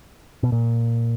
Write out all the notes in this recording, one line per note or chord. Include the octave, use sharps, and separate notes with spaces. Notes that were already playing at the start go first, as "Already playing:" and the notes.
B2
A#2